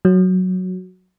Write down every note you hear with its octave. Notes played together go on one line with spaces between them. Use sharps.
F#3